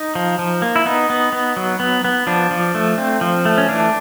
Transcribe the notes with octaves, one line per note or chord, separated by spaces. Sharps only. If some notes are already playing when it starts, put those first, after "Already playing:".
Already playing: D#4
F3
F3
A#3
E4
B3 D#4
B3
B3
F#3
B3
B3
F3 D4
F3
A3
C4
F3
A3
C#4
E3 D4